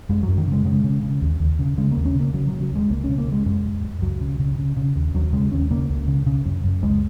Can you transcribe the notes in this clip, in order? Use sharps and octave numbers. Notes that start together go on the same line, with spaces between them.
F#2 G#3
F#2 F#3
D#3
C#3 G#3
C#3 G#3
C#3
C#3
D#2
D#2
C#3
C#3 G#3
A#3
D#2
C#4
C#3 A#3
C#3 F#3
F#3
C#3
F#3
D#2 G#3
C#2 A#3
C#3 C#4
A#3
C#3 G#3
F#2 G#3
F#2
F#2
C#2 F#3
C#3
C#3
C#3
C#3
D#2
D#2 F#3
C#3 G#3
D#2 C#4
C#3 A#3
C#2
C#3
C#3
F#2
F#2
C#2 G#3